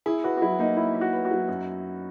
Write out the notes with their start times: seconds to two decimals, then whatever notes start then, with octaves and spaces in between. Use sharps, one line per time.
0.06 E4 G#4
0.24 F#4 B4
0.37 F#4
0.42 F#3 E4
0.59 A#3 D#4
0.77 A#3 E4
0.95 E4
1.01 F#4
1.13 B4
1.25 F#4
1.31 F#3
1.48 F#2